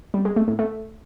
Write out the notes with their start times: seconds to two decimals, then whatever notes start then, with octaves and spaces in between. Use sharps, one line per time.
0.14 G3
0.25 G#3
0.36 A3
0.48 A2
0.59 A3